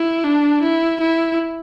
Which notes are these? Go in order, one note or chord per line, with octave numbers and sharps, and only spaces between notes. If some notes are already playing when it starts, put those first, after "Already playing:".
Already playing: E4
D4
E4
E4